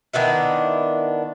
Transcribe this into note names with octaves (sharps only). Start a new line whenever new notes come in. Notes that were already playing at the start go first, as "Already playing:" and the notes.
D#3 B3 D4 E4